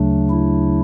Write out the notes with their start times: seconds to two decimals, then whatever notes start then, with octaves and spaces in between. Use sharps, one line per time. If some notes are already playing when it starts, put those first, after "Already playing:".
Already playing: D2 C#3 F#3 A3 D4
0.30 E4